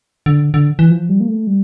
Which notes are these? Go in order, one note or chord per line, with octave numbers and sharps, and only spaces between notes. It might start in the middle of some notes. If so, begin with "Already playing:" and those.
D3
D3
E3
F3
G3
A#3
A3
G3